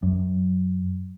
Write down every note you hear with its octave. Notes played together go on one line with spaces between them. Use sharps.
F#2